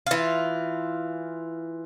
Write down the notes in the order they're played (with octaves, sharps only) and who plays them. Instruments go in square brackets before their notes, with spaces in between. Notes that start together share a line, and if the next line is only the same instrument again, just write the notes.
[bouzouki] E3 F4